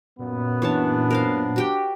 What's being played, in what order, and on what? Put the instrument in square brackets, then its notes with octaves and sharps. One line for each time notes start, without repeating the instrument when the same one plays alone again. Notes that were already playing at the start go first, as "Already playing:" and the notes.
[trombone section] F#2 B3 [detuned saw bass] A#2
[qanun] E3 C#5 A5 [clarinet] D4
[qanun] A#4 C5 F5
F#4 G4 G5